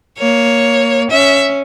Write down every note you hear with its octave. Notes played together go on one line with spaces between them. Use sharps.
A#3 C#5
C#4 E5